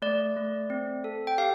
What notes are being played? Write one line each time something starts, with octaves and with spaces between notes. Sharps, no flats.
A3 D5
A3
C4
A4
G5
G4 F5